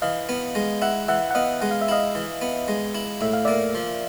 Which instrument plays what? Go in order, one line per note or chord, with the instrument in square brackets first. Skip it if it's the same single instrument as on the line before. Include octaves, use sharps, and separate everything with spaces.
[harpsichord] E3 [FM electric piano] D#5 F5
[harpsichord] B3
G#3
[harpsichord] E4 [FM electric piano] E5 F#5
[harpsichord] E3 [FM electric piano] E5 F#5
[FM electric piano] F#5
[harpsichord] B3 [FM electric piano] D#5 F5
[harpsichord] G#3 [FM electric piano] F#5
[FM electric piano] F5
E5
[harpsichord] E4 [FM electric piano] D#5 F5
[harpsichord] E3
B3
G#3
E4
[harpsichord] A2 [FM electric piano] E5
[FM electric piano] F5
[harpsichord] A#3 [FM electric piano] D5 E5
[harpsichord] F3